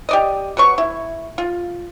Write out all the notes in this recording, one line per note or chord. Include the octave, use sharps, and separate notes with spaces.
G4 D5 D#5
B2 F#3 C#6
E4
F4